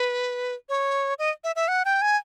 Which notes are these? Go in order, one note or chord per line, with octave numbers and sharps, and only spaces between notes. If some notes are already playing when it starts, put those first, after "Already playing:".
Already playing: B4
C#5
D#5
E5
E5
F#5
G5
G#5